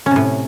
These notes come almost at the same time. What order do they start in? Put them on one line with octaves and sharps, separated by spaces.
C#4 C3 A2